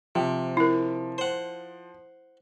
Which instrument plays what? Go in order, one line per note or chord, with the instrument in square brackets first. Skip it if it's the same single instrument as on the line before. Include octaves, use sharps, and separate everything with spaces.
[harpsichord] C3 [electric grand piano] F3
[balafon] E4 A#4
[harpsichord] C5 F#5